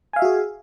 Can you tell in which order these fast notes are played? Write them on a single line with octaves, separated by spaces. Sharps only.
G#5 F5 E5 F#4 G#4